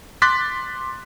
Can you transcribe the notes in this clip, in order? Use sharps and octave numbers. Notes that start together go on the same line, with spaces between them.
C6 D6 F#6 A6 B6